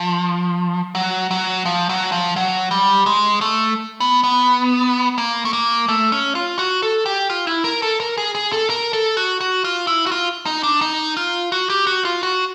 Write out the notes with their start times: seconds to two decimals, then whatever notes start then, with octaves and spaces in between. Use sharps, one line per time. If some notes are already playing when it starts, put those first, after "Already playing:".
Already playing: F3
0.95 F#3
1.31 F#3
1.65 F3
1.89 F#3
2.12 F3
2.36 F#3
2.71 G3
3.06 G#3
3.41 A3
4.00 B3
4.23 B3
5.18 A#3
5.45 A3
5.53 A#3
5.88 A3
6.12 C#4
6.35 F4
6.59 F#4
6.82 A4
7.06 G4
7.30 F4
7.47 E4
7.64 A#4
7.82 A4
8.00 A#4
8.17 G#4
8.35 G#4
8.52 A4
8.70 A#4
8.93 A4
9.17 F#4
9.41 F#4
9.64 F4
9.87 E4
10.06 F#4
10.12 F4
10.46 D#4
10.63 D4
10.81 D#4
11.17 F4
11.52 F#4
11.70 G4
11.87 F#4
12.05 F4
12.23 F#4